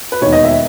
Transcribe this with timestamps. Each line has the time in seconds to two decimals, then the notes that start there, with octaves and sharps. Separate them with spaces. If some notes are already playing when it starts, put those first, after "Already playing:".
0.12 B4
0.21 E1 D#2 D#3 C#5
0.33 D#5
0.44 E5